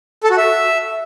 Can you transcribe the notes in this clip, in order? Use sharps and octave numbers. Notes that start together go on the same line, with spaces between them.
A4
F#4
E5